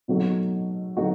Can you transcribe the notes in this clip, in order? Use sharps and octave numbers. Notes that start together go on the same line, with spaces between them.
B2 F#3 A3 D#4 F#4
F#3 A3 D#4 F#4